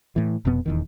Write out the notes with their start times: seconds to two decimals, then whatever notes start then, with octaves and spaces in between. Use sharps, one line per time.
0.16 A2 E3
0.45 F1 F2 B2 B3
0.66 D#1 E2 D#3